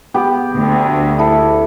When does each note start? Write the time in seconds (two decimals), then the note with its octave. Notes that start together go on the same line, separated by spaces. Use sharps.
0.14 B3 G4
0.55 D2
1.19 E4 A4